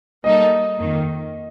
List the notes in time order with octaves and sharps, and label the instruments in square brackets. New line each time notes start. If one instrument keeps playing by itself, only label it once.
[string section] G3 A#3 D#4 A4 [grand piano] D#5
[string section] F2 D#3 A#3